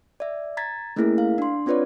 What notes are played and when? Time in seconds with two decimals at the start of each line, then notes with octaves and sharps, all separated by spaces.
0.20 D5 E5
0.57 A#5 G#6 A6 B6
0.96 A3 A#3 C#4 E4 G#4 A#4
1.18 F5
1.38 D4 C6
1.66 C4 D4 F4 B4 C#5 D5